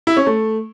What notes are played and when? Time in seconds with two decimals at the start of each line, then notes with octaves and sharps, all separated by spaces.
0.07 E4
0.17 C#4
0.26 A3